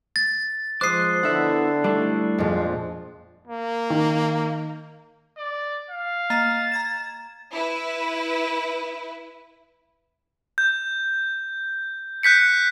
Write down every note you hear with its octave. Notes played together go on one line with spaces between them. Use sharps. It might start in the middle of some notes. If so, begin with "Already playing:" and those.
A6
F3 G#3 C5 D6 D#6 F#6 C7
D3 B3 E4 E5 F#5
G3 A3 D4 E4
F2 A#2 G#3
A#3
D#3
D5
F5
A#3 D#5 A#5 A6
A#5 G#6 E7
E4 B4
G6
F#6 G6 B6 C#7